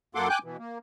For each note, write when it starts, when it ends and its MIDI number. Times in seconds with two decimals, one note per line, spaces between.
0.15 0.29 42
0.15 0.29 58
0.15 0.29 69
0.15 0.29 78
0.15 0.29 84
0.15 0.29 86
0.29 0.39 79
0.29 0.39 80
0.29 0.39 86
0.29 0.39 90
0.29 0.39 91
0.44 0.57 47
0.44 0.57 52
0.59 0.78 58